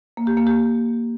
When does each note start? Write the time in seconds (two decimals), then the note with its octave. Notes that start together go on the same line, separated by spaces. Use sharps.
0.17 A#3
0.27 G4
0.37 A#3
0.47 G4